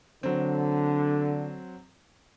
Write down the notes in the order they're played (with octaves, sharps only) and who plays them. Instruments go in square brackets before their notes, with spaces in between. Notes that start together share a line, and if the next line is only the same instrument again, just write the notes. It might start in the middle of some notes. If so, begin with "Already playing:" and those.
[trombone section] D3 [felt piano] F#3 C4